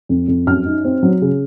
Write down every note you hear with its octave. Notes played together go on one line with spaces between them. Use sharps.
F2
F2
F#2 F6
D#4
C4
F#3
C#3